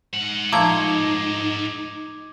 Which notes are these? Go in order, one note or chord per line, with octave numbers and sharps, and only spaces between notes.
G#2 F#5
F3 A3 A#3 D#4 D6 G#6 G7